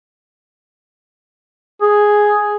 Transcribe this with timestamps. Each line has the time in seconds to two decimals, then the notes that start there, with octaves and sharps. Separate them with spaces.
1.82 G#4